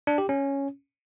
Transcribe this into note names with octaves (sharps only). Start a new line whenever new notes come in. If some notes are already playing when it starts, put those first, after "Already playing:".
D4
G4
C#4